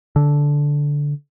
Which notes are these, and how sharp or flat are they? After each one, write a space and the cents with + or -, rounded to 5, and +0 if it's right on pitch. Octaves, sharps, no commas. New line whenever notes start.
D3 -10